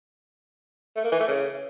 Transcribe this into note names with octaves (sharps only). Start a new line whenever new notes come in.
A3
A#3
E3
A3
C#3